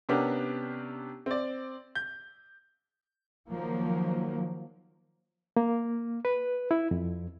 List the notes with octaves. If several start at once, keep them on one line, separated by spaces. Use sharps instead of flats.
C3 B3 C#4 D4 G4 A#4
C4 D5
G6
D#3 F3 F#3 A#3
A#3
B4
E4
F2